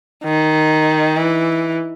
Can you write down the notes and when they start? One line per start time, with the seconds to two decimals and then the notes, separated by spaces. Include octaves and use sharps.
0.23 D#3
1.16 E3